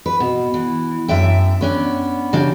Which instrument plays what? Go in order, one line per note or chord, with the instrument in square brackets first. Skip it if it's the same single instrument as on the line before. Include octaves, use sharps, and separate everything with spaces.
[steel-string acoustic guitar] B4
B2
E3
F#2 D4 E5 G5
B3 C#4 D4
C#3 D4 G4